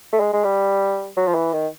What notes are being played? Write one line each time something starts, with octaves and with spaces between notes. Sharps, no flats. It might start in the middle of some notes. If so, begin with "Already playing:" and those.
A3
G#3
G#3
G3
F#3
F3
E3
D#3